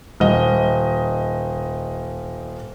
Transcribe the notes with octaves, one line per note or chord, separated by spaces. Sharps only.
D#1 D#5